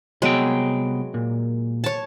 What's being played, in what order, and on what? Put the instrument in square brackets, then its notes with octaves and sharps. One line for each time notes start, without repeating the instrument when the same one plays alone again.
[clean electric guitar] C2 B3 G5 [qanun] F#3 G#3
[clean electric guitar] A#2
[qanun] C#5 A5